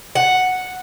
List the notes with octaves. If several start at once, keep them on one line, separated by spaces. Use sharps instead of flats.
F#5